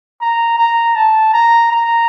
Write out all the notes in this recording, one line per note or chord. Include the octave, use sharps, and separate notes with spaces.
A#5
A#5
A5
A#5
A#5